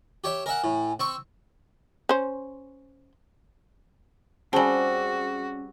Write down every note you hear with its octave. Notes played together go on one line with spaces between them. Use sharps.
G4 C#5 E5
A#4 E5 F#5 G#5
A2
C4 C#6 E6
C#4 C5
G3 C4 C#4 F#4 G#4 G#5 A5